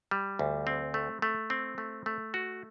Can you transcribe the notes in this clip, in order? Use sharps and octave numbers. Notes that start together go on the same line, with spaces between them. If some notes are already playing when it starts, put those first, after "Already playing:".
G3
D2
C4
A3
A3
C4
A3
A3
F#4